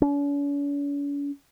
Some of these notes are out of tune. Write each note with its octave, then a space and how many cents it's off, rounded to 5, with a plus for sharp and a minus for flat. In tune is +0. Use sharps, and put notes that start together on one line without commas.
C#4 +45